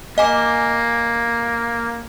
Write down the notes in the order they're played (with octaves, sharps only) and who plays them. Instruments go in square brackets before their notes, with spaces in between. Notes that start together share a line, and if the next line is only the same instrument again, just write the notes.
[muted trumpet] A#3 [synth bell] D#5 G#5 D6